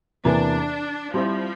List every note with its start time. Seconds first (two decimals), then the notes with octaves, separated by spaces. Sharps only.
0.24 E2 C3 E3 A#3 D4
1.14 F3 G3 C4 E4